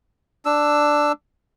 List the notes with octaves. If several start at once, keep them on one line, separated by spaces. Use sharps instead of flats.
D4 E6